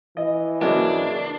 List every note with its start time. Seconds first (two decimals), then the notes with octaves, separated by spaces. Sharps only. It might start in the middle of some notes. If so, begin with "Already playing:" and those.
0.17 E3 D#5
0.61 G#2 C#3 F#3 G#3 A#3 D4